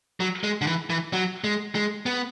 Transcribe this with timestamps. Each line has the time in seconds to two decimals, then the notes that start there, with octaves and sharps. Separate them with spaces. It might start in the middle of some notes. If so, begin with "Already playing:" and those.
0.20 F#3
0.44 G#3
0.61 D3
0.67 E3
0.90 E3
1.13 F#3
1.44 G#3
1.75 G#3
2.06 B3